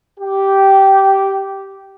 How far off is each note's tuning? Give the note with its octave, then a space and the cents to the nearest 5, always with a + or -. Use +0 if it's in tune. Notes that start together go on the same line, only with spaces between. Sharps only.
G4 -10